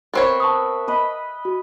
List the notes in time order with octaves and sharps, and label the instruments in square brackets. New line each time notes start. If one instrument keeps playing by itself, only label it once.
[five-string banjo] B3 C4 C#5 [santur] A#4 B4 E5
[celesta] A5 C#6 D#6
[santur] B4 D#5 B5
[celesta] F#4